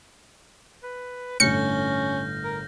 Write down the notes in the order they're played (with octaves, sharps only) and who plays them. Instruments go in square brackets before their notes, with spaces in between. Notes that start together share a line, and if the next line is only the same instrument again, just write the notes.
[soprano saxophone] B4
[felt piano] G1 A2 [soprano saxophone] C#4 [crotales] F6 G6 A#6 [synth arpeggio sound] C#7
[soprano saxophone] A#4